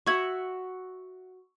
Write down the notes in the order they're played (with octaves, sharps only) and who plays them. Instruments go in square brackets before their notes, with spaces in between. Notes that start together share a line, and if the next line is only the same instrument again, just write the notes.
[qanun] F#4 E5 F#5 [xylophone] C#6 G#6